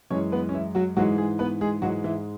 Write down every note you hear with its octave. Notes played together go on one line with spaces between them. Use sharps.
F#2 E3 G#3 C#4 C#5
B3 B4
C#4
E3 E4
F#3 F#4
G#2 E3 F#3 G#3 F#4
G#3 G#4
B3 B4
G#3 G#4
G#2 E3 F#3 G#3 F#4
E3 E4